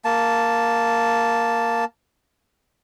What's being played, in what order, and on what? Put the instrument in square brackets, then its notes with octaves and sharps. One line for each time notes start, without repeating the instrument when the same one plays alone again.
[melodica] A#3 A5